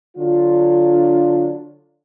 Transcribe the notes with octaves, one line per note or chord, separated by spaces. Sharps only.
D3 F#3 D4 F4